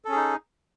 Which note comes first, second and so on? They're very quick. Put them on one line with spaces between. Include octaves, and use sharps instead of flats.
A4 C#4 G#4 D#4